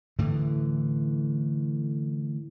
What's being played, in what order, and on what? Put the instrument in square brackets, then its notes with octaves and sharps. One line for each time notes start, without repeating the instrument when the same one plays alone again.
[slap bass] A2 D3 E3